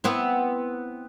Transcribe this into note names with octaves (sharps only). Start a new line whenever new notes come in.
B3 C4 E4